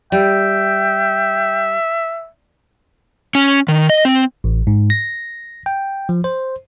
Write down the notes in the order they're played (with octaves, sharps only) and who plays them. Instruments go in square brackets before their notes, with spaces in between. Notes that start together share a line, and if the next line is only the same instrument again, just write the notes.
[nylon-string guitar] G3 [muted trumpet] E5 [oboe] G5
[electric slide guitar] C#4
D#3
D#5
C4
[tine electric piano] A1
G#2
A#6
G5
F3
C5